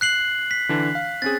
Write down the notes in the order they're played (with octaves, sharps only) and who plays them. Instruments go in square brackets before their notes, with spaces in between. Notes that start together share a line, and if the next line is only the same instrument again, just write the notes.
[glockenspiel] F#6 C7 F#7
B6
[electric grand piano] D3 E3 D4
F5
[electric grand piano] C4 C#4 G#4 [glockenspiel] A6